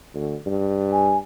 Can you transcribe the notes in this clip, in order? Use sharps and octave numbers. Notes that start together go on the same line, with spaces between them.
D2
G2
G#5